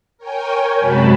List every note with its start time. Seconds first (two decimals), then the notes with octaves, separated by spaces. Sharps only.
0.18 A#4 C#5 G5 G#5
0.78 F#2 C3 G#3 F#4 A5 B5